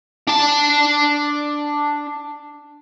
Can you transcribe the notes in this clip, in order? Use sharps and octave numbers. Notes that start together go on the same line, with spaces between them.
D4 A5